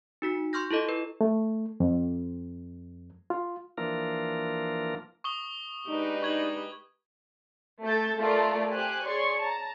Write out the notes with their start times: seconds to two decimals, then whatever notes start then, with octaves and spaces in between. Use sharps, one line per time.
0.22 D#4 F#4 B6
0.53 C6 C#6 F6 G6 A#6
0.71 E4 F4 A4 D#5
0.89 B4
1.21 A3
1.80 F2
3.30 F4
3.78 E3 F3 A#3 D4 F4 A#4
5.24 C#6 D#6 G7
5.88 G#3 D4 D#4 G4 B4
6.22 C#6 G#6 F#7
7.82 A3 A4 G6 A6
8.18 A3 F4 A#4 D5 A5
8.71 G4 C5 G#5 F#6
9.05 G#4 C#5 D5 C6 C#6
9.39 A5 A#5